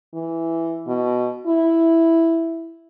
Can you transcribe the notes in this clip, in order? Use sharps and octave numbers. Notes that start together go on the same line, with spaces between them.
E3
B2
E4